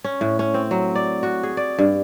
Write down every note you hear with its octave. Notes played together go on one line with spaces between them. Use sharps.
C#4
A2
C#4
C4
F#3
D5
F#4
G#4
D5
G2